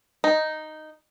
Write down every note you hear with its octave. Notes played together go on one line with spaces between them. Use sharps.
D#4